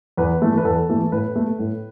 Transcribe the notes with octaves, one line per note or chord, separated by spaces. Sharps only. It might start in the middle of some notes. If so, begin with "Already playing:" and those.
E2 B4
E3 A3
B4
E2 A4
E3 A3
A2 B4
A3
A2